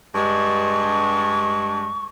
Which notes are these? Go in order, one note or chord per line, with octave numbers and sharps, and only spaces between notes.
G2 G#3 C#6